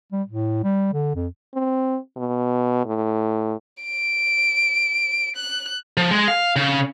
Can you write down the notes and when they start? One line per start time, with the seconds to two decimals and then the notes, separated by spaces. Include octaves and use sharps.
0.12 G3
0.27 A2
0.63 G3
0.93 D3
1.15 F2
1.54 C4
2.17 B2
2.85 A2
3.83 D7
5.36 F#6
5.97 F3
6.11 G#3
6.28 F5
6.56 C#3